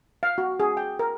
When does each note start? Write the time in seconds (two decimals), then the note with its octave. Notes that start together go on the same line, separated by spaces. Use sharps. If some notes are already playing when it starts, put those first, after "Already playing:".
0.23 F5
0.38 F#4
0.60 G#4
0.77 G5
0.99 A#4